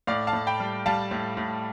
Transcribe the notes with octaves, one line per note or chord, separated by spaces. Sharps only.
A2 D5 F5
F5 A5
A2
G5 B5
G3
G3 F5 A5
A2
A2